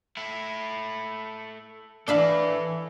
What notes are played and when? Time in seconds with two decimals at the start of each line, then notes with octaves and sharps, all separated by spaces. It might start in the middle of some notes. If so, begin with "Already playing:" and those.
0.17 A3 E4
2.08 E3 D4 A4 E5 F5 B5